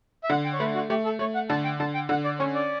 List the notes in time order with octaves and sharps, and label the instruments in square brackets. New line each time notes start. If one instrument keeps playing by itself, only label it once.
[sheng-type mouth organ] E5
[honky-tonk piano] D3 [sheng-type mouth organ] F#5
[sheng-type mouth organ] G5
C#5
[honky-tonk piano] A3 [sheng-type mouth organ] B4
[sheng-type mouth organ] F#4
[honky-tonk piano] A3 [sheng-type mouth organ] G4
[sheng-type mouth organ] A4
[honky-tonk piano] A3 [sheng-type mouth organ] C#5
[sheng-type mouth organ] F#5
[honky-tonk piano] D3 [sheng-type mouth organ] A5
[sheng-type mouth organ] G5
[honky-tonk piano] D3 [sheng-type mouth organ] A5
[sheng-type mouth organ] G5
[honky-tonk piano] D3 [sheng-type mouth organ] F#5
[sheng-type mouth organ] D5
[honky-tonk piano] C#4 [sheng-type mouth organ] C#5
[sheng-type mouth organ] D5